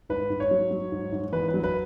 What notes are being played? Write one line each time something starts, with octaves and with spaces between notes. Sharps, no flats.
G#2 B4
G#2
C#5
F#3
F#3
G#2
G#2
E2 B4
B4
F#3
B4